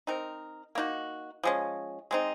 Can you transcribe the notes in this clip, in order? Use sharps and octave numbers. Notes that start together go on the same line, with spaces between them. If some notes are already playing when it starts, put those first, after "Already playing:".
C4 D#4 A#4
A#3 D#4 F#4
F3 G#3 C#4
G#3 C4 D#4